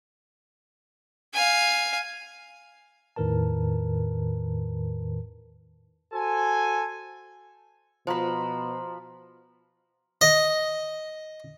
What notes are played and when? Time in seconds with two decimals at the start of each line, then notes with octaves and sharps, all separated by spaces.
1.34 F5 G#5
3.16 E2 A2 D#3 A#4 B4 A5
6.13 F#4 A4 C5 G#5
8.07 B2 F3 C5 A#5 B5
10.21 D#5